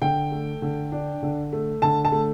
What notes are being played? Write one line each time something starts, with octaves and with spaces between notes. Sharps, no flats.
D3 G5
A3
D3
D4
D3
A3
D3 A5
A5
A3